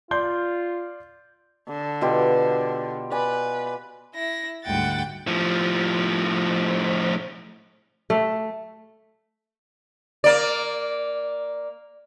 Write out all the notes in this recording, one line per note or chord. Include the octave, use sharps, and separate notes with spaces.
F4 D5 C6 G6
D3
B2 F4 G4
B4 D5 G#5
E4 A#6
D2 G#2 G3 F#5 G5 A6
A2 F3
A3
A#3 D5